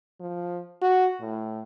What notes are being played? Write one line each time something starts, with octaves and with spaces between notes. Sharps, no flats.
F3
F#4
A2